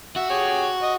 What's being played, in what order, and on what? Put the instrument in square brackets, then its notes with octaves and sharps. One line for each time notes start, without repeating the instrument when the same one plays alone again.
[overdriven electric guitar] F#4 [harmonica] E5
[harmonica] G4 G#4 C#5
D#5